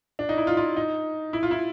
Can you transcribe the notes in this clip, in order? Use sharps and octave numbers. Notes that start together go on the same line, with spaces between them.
D4
D#4
E4
F4
F4
D#4
E4
F4
E4